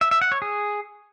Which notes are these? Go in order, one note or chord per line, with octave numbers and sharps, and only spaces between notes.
E5
E5
F#5
C#5
G#4